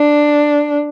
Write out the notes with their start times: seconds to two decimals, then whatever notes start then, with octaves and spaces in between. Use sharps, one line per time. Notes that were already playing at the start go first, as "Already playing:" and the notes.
Already playing: D4